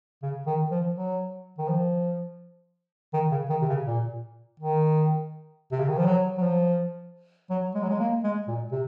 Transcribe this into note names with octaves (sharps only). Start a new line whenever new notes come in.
C#3
D#3
F3
F#3
D#3
F3
D#3
C#3
D#3
C3
C#3
A#2
D#3
C3
C#3
D#3
F3
F#3
F#3
F3
F#3
G#3
F#3
G#3
A#3
G#3
A#2
C3